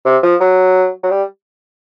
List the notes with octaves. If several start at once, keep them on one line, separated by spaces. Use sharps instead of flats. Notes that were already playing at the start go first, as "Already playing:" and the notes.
C3
F3
F#3
F#3
G3